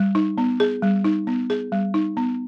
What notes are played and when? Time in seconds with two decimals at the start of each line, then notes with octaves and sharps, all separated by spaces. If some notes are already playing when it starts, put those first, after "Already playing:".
Already playing: G3
0.15 D#4
0.38 B3
0.60 G#4
0.82 G3
1.04 D#4
1.27 B3
1.50 G#4
1.72 G3
1.94 D#4
2.17 B3